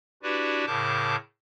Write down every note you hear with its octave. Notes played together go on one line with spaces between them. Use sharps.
D4 E4 F#4 G4 B4 D5
A2 C#3 A#4 A5 D6 G6